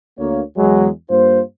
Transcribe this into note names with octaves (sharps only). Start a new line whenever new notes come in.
D2 A#3 C#5
E2 F#3 G#3
G2 A#3 F4 C5